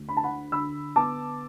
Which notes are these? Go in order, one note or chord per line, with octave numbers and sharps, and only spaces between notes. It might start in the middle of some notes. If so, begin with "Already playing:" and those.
Already playing: D2
D4 B5
A5
F#5 B5
D3 B5 E6
B3 A5 D6